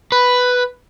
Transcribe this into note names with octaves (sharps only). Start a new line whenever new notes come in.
B4